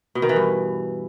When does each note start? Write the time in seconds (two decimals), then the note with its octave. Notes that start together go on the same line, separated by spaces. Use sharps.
0.15 B2
0.22 D#3
0.29 E3
0.36 G2